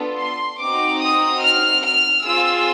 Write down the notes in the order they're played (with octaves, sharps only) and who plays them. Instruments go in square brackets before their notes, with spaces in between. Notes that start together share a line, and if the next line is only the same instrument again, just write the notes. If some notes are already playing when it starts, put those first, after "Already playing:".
Already playing: [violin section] B3 D4 F4 A4
C6
C4 D#4 F#4 D6
D#6
F6
F6
C4 F4 G#4 E6